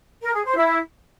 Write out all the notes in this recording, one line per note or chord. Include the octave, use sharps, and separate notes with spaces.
A#4
G#4
C5
E4